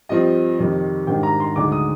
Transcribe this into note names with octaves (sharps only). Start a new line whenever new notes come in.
G2 F3 C4 D#5
F2 C3 D#3
G#2 D#3 G3 D4 G5
A#5
C6
D2 D3 G#3 D#4 D6
D#6